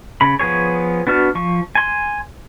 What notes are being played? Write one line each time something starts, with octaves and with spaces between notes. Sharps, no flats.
C#3 B5
F3 B3 G#4 C#5
B3 D4 F#4 F6
F3 C#6
G#5 C6